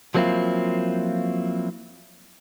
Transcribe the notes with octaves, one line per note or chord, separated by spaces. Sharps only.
F3 F#3 A#3 C4 E4 F4